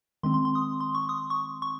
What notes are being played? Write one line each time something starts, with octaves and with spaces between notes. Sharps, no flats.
D#3 G#3 C4 C6
C6
C6
D#6
C6
C#6
D#6
C#6
C#6